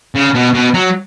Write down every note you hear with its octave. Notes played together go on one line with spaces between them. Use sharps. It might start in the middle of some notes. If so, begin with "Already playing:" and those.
C#3
B2
B2
F#3